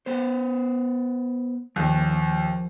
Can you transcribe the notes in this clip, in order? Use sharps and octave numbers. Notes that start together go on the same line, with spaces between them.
B3 C5
D#2 F3 G#4